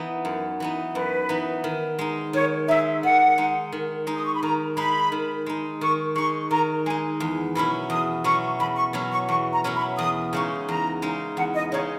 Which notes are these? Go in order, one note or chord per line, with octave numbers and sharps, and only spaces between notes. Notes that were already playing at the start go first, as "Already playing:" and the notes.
Already playing: E3 B3 D#4
F#2
E3 B3 D#4
F#2 B4
E3 B3 D#4
D#3
G#3 D#4
D#3 C#5
G#3 D#4 E5
D#3 F#5
G#3 D#4
D#3
G#3 D#4
D#6
C#6
B5
D#3 A#5
G#3 D#4 B5
D#3
G#3 D#4
D#3 C#6
G#3 D#4 C#6
D#3 A#5
G#3 D#4 G#5
E2
B2 F#3 C#4 E4 B5
E2 D#6
B2 F#3 C#4 E4 C#6
E2 B5
C#6
B2 F#3 C#4 E4
C#6
E2 C#6
A#5
B2 F#3 C#4 E4
B5
E2 D#6
C#3 G#3 D#4 C#6
E2 A#5
C#3 G#3 D#4
E2 F#5
D#5
C#3 G#3 D#4 C#5